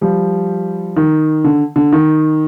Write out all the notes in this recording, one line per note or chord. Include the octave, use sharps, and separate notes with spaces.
F3 G3
D#3
D3
D3
D#3